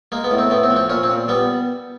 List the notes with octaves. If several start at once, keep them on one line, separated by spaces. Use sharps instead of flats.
G#3 A#3
B3
A2
C4
A2 B3
C4
F3
C4
A#2 C#4
C4
A#2
G3 B3